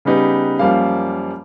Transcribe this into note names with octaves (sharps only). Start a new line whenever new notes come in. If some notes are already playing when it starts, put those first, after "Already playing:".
C#3 G3 B3 D#4 G4 B4
F#2 F3 G3 A#3 F5